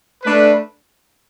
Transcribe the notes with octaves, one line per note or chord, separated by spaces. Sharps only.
A3 D4 B4